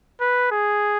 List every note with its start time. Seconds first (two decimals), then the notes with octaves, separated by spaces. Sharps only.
0.21 B4
0.51 G#4